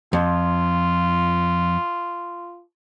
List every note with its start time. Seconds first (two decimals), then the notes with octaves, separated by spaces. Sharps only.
0.13 F2 F4